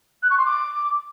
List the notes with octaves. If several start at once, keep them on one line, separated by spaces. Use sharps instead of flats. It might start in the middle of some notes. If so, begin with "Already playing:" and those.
F#6
C#6
C6
D6